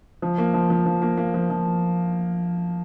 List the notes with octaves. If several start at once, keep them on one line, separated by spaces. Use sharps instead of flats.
F3
A#3
F3
F3
F3
A#3
A#3
F3
F3